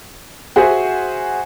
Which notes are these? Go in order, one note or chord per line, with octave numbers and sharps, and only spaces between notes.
F#4 G#4 C5 E5 F#5 G#5